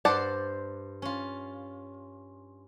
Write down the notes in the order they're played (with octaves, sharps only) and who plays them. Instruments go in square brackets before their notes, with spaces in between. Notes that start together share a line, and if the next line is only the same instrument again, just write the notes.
[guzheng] G2 C5 C6 [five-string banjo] D5 F#5 A5
[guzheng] C#4 F4